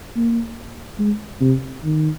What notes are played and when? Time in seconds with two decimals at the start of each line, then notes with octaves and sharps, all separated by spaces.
0.16 A#3
0.99 G#3
1.41 C3
1.84 D#3